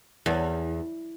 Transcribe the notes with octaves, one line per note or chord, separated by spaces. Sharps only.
E2